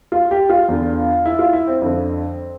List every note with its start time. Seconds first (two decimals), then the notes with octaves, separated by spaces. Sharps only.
0.12 F4
0.31 G4
0.50 F4
0.68 E2 D3
1.26 E4
1.39 F4
1.53 E4
1.67 C4
1.82 F2 D3